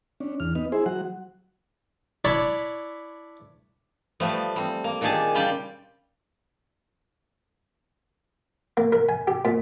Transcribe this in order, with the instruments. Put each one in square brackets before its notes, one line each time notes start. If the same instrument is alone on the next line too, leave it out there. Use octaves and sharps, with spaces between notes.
[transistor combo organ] C#4 D4
E2 F6
B3 D#4
E4 G#4 C5
F#3 F#5
[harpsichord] D4 E4 C#5 D5 A5 B5
[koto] F3 G3 A3 B3
G3 C4
A#3
A#2 D#3 D4 G4 G#4 A5
C#3 G3 F4 G4 D5 G5
[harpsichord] A#3
A#4
G#5
G4
A#2